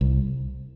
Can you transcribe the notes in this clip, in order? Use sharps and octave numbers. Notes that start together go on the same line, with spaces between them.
C2